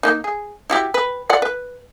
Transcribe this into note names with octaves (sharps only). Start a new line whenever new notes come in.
A#3 D#4
G#4
E4 F#4 G4
B4
F4 D5 F#5
B4